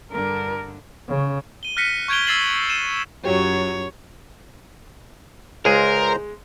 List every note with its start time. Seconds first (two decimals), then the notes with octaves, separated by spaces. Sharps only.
0.12 G2 D3 A#4
1.09 C#3
1.63 D#7 G7
1.77 F6 F#6 A#6 B6 C#7 D#7
2.08 C#6 G6 G#6 D7 F7 G7
2.27 E6 G#6 A6 C7 E7 F#7
2.69 D#7 E7 G7
3.25 F#2 F#3 F4 G4 C#5
5.65 C#2 G#3 G#4 A#4 C5 A#5